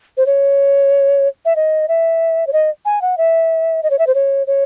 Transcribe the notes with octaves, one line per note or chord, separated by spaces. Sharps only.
C5
C#5
E5
D#5
E5
C#5
D#5
G#5
F#5
E5
D#5
C#5
E5
C5
C#5
C#5